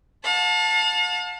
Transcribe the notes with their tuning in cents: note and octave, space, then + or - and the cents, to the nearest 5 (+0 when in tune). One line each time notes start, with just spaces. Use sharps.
F5 +45 A5 +0